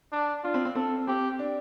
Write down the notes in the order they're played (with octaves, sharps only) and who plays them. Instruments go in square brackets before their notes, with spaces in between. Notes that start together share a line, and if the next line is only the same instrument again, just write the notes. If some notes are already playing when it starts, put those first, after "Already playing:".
[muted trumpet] D4
[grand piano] D4 [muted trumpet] F4
[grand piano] C4
C4
[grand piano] C4 [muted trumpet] A4
[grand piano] C4 [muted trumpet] G4
[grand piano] D4